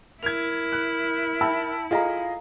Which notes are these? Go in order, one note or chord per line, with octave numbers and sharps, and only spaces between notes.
E4 A#4 G#6 F7
F#6
D#4 E5 G5 A5 B5 E6
F4 G#4 A4 D#5 F5 A#5